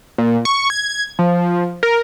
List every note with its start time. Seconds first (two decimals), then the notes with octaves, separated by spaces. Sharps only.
0.18 A#2
0.45 C#6
0.70 G#6
1.19 F3
1.83 A#4